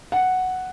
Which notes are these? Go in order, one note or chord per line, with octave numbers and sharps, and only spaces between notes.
F#5